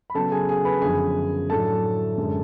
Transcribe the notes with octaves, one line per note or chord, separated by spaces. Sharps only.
B5
C#3 F#3 B3 A4 A5
G#4 G#5
G#4 G#5
B4 B5
F#2 D3 F3 B3 G#4 G#5
A2 F#3 A3 D4 A4 A5
F#2 D3 G#3 D4